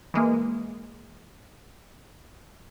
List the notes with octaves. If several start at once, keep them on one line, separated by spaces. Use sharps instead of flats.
E3 G#3 A#3